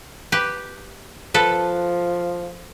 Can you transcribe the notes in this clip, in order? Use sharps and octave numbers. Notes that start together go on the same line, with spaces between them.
G4 B4
F3 A4 B4